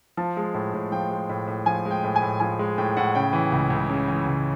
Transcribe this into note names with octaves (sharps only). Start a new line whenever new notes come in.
F3 A5
G#3
A2
A2
F3 G5
G#3
A2
A2
F3 G#5
G#3
G5
A2
G#5
A2
F3 G#5
G#3
A2 G5
A2 F#5
C#3 G5
E3
C#2
C#2
C#3
E3
C#2